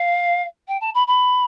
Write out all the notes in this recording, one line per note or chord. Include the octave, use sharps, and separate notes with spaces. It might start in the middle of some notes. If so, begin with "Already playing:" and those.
Already playing: F5
G5
A5
B5
B5